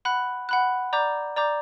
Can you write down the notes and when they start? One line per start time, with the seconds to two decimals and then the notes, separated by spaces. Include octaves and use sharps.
0.05 F#5 B5 F#6
0.49 F#5 B5 F#6
0.93 D5 A#5 D6 G6
1.36 D5 A#5 D6 G6